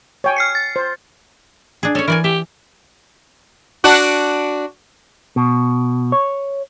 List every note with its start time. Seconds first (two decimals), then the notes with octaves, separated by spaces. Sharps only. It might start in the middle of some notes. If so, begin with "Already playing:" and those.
0.24 C#5 G5 G#5
0.36 F6 C7 C#7
0.55 A6
0.76 C5
1.83 D4 G#4
1.95 C#4 A4 C#5
2.08 E3 A#4 D5 G#5
2.24 G4 E5
3.84 D4 F#4
5.36 B2
6.12 C#5